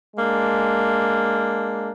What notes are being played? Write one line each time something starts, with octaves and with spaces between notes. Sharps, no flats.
G#3 A#3 D4